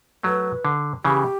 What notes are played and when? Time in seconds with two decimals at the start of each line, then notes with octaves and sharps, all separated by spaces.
0.23 F#3 A3 B4
0.65 D3
1.04 C#3 E3 G4